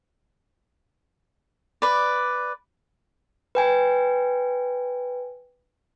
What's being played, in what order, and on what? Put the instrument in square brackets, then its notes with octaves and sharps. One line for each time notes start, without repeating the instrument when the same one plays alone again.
[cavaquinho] B4 D5
[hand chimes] B4 G5 G#5